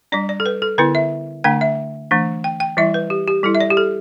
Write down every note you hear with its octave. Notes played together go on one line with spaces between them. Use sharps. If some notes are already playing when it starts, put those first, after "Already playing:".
G3 D4 D5
D5
A4
B4
A4
D3 B3 E4 B4
E5
D3 A3 D4 G5
E5
E3 A3 D4
G5
G5
E3 G3 E4 E5
B4
G4
G4
G3 E4 A4
E5
D5
G4
A4